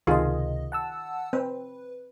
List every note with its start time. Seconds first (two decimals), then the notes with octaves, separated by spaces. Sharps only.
0.07 C#2 C3 D#3 F4 G#4 D#5
0.72 F#5 A5 E6
1.33 C4 B4